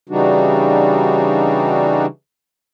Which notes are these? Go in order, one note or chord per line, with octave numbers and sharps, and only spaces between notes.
C#3 E3 G3 D4 D#4 F#4